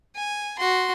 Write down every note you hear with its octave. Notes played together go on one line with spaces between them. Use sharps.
G#5
F#4 C6